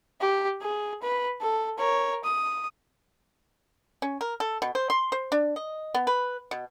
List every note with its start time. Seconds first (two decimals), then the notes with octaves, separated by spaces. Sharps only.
0.21 G4
0.62 G#4
1.02 B4
1.41 A4
1.78 A#4 C#5
2.24 D#6
4.02 C#4
4.21 A#4
4.40 A4
4.62 B2
4.75 C5
4.90 C6
5.12 C5
5.32 D4
5.56 D#5
5.94 B3
6.07 B4
6.51 B2